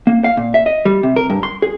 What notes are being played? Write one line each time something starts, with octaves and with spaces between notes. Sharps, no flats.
A#3
F5
A#2
E5
D#5
G3
C3
A#4
G2
C6
G#4